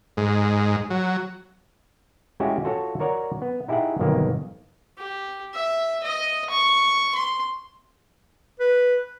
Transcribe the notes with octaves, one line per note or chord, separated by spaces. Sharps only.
G#2
F#3
G#3 C#4 E4 F#4 G4
F4 F#4 A4 C#5
F#4 A#4 C#5 D5 F#5
B3
D#4 E4 G4 G#4 E5 F#5
G1 B2 D#3 F#3 A#3 G4
G4
E5
D#5
C#6
C6
B4